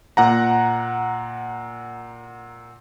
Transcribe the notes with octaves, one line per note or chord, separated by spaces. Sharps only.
A#2 F#5 A#5